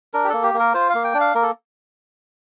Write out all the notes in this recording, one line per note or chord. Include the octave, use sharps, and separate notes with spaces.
D4 A#4
G4
A#3 A4
G4
A#3
A#4
F4 C5
F5
A#3
G5
D4
F5
A#3 A#4
A4